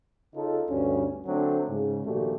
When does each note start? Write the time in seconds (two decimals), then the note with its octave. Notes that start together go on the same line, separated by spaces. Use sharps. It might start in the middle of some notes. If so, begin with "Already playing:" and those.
0.35 C#3 D#4 F4 A4
0.69 D2 G2 C#4
1.25 D3 F#3 A3 C4 D4
1.69 G#2 C#3
2.05 A#1 A#2 D#3 A3 F#4 G4